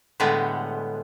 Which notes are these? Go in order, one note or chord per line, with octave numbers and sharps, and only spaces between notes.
A2 D3 G3 G#3 B3